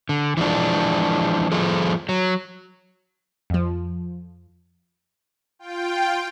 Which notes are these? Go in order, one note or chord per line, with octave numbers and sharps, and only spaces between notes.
D3
E3 F3 G#3 D4
F3 F4 G#4 A4
F#3
F2 F3
F4 G5